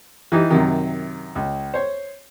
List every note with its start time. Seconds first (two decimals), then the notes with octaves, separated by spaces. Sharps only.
0.32 E3 D#4 G4
0.50 F#2 C3 D#3
1.35 C#2
1.74 C5 C#5